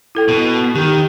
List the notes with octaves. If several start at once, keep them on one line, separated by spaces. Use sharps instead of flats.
E4 A4 G5
B2
D#3 G4